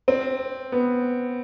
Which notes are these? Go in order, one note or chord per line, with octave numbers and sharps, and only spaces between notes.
C4
B3